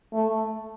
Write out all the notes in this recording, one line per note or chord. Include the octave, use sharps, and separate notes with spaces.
A3